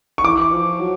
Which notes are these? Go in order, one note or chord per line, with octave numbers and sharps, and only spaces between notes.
C#6
E3 D6
F3
F#3